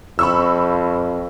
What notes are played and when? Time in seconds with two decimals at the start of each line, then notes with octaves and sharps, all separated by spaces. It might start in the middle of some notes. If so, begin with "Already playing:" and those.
0.19 F2 B5 C#6 E6